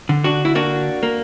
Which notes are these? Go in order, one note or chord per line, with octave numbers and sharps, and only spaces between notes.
D3
D4 F#4
E4
A#3 D4 F#4
A#3